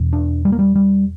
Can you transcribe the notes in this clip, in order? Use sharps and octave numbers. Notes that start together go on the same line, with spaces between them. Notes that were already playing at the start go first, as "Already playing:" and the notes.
Already playing: E2 B2
D4
G3
A#3
G3
G3